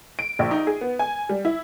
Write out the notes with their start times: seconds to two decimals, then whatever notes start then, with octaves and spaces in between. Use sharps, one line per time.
0.19 D7
0.39 A#1
0.51 D#4
0.67 G#4
0.81 B3
0.99 G#5
1.29 G3
1.45 E4